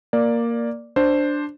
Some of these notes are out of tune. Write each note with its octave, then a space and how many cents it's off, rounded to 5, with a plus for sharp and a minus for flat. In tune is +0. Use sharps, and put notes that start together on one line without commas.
A#3 +0 D5 +0
D4 +0 C5 +0